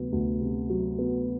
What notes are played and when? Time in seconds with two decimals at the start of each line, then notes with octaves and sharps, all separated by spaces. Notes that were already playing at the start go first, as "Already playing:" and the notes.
Already playing: D2 C3 F#3 B3
0.12 D2
0.41 C3
0.70 F#3
0.99 B3